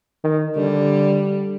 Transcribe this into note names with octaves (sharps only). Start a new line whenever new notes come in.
D#3
D3 G3